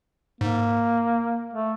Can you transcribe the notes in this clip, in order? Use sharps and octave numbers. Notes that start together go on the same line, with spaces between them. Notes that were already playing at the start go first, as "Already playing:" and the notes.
G#2 A#3
A3